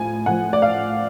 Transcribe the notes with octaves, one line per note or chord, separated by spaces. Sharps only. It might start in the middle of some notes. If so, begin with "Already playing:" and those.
Already playing: A2 F3 G#5
A2 F3 F#5
D5
F5